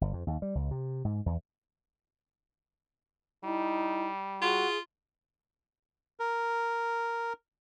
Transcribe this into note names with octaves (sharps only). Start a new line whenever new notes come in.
G1
F2
D#2
G3
C#2
C3
G#2
E2
G3 D#4 E4
F4 F#4 G#4
A#4